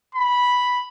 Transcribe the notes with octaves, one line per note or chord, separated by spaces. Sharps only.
B5